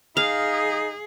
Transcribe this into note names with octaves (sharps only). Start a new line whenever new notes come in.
D#4 G#4 F5